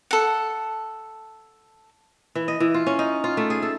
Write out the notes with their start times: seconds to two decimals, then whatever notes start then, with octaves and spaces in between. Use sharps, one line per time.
0.11 A4 F#5
2.35 E3
2.48 D#5
2.60 E3
2.74 F4
2.87 C#4
2.99 D#4
3.24 F4
3.37 A3
3.50 G#4
3.63 A4